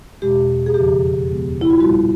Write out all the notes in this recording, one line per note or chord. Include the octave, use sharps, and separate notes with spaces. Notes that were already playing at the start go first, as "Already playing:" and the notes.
E2 B2 G#3 G4
G#4
F2 C#3 F3 G4
D#2 C#3 F3 G#3 B3
E4
F4
A#2 G3 B3 F#4